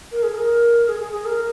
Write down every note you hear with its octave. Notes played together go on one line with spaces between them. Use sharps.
A#4
G#4
A#4
G#4
G#4
G#4
A#4